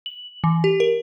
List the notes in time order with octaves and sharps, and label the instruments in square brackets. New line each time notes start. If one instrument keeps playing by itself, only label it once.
[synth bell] F#7
E3
G4
A#4